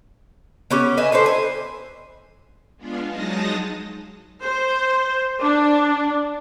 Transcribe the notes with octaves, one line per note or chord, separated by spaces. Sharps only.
B3 C#4 G4
B4 D#5 E5 G#5
D4 A4 B4 C5
G#5
G#3 B3 D4 F4 G#4 F5
F#3 G#3 D#4 A5 D#6 A#6
C5
D4